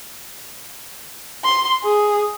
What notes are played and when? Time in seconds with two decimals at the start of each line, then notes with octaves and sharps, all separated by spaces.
1.44 C6
1.84 G#4